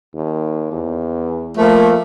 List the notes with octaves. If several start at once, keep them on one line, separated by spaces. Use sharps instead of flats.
D#2
E2
F3 A3 A#3